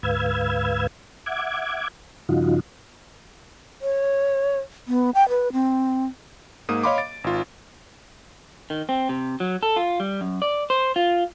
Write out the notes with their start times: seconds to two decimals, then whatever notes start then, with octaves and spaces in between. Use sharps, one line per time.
0.03 D2 G#2 B4 F5 E6 G#6
1.26 E5 F#5 D6 G#6
2.29 G2 C#3 F3 D#4 F4 F#4
3.82 C#5
4.88 B3
5.15 G5
5.29 B4
5.53 C4
6.69 G#2 A#3 D#6 D#7
6.84 C#5 D#5 F5 B5 C6 D6
6.98 A6 D7
7.24 G#1 F4
8.70 D#3
8.89 C4
9.09 C3
9.40 F#3
9.63 A4
9.76 F4
10.00 G3
10.21 F#2
10.42 D5
10.70 C5
10.96 F4